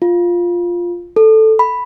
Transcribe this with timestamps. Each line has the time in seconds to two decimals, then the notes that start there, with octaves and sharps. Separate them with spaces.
0.02 F4
1.16 A4
1.59 B5